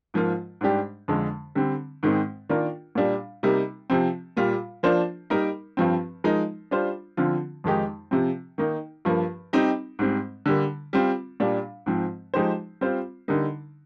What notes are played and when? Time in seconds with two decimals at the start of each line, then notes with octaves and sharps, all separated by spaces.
0.14 G#2 F3 A#3 F4
0.61 G#2 G3 D4 G4
1.08 F2 D3 G#3
1.55 D3 G3 C4
2.03 G#2 D#3 G#3 C4
2.49 D#3 A#3 D4 F4 A#4
2.95 A#2 G3 D4
3.43 C3 G3 A#3 D#4
3.90 C3 F3 C4
4.36 A#2 G3 A#3 F4
4.83 F3 A#3 D4 F4 C5
5.30 G3 A#3 D#4 A#4
5.77 G2 F3 C4
6.24 F3 G#3 D#4 A#4
6.71 G3 D4 F4 C5
7.17 D3 F3 C4 F4
7.64 F2 D#3 G#3 D#4 G4
8.11 C3 F3 C4
8.58 D#3 A#3 D#4
9.05 G2 F3 A#3
9.53 G3 C4 D#4 G4
9.99 G#2 G3 C4
10.46 D3 G3 A#3
10.93 G3 C4 F4
11.40 A#2 G3 D4
11.86 G#2 F3 C4
12.34 F3 G#3 D#4 G4 C5
12.81 G3 C4 F4 C5
13.28 D3 G3 A#3 D#4